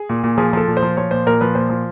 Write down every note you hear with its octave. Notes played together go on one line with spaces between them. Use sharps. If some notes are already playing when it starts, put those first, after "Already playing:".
Already playing: G#4
A#2
A#2
F3 G#4
F3 A4
A#2
C5
F3
F3 C#5
A#2 C5
A#2 A#4
F3 B4
A#2 C5
F3